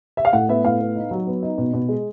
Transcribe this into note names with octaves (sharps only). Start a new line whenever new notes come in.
E5
F5
A2 F#5
B3 E5
A2 F5
B3
D#4
F#3
B3
D#4
B2
B2
G#3